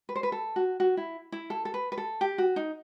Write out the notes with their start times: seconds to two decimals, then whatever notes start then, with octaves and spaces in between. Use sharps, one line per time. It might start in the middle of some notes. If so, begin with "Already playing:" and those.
0.09 B4
0.16 C5
0.23 B4
0.32 A4
0.56 F#4
0.80 F#4
0.97 E4
1.32 E4
1.50 A4
1.65 A4
1.74 B4
1.92 B4
1.98 A4
2.21 G4
2.38 F#4
2.56 D#4